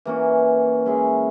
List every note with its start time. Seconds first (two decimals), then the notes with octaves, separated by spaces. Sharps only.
0.05 E3 A#3 C#4 F#4
0.86 G#3 C#4 E4 G#4